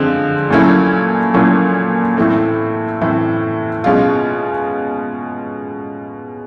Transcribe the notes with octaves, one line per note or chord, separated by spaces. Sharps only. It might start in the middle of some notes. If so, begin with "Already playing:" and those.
Already playing: D3 F3 G#3 C4
A#2 F#3 A3 C#4 E4
A#2 F#3 A3 C#4 E4
A2 E3 A3 C4
A2 E3 A3 C4
B2 G#3 C#4 F4